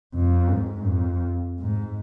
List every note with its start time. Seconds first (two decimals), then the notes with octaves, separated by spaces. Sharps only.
0.14 F2
0.50 G#2
0.87 F2
1.59 G#2